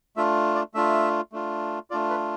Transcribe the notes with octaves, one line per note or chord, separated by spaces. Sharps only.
A3 D4 F4 E5
D5
A3 D4 F4 E5
A3 D4 F4
A3 D4 F4 D5
B4